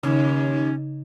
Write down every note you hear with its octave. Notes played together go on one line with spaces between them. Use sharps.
D#2 C#3 C#4